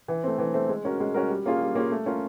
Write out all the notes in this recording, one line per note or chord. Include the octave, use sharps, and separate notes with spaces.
E3
A3 C4
E3
A3 C4
G#3
C#4 F#4 A#4
G#3
C#4 F#4 A#4
G3
A#3 C#4 F4 G#4
G3
A#3 C#4 F4 G#4
A3
C#4 F4 A#4